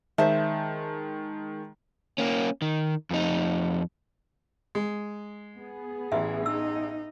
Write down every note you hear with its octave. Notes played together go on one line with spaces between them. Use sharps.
D#3 G#3 C5 E5 A5
A#3 C#4
D#3
F2 D#4
G#3
B3 G#4
A1 E3 E5
D#4 E6